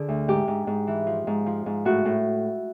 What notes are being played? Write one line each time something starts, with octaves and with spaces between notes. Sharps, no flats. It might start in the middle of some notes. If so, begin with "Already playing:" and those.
Already playing: D3 G#4
D2
G#2 G4
G#2
G#2
E3
F3
G#2
F3
G#2
A2 F#4
A2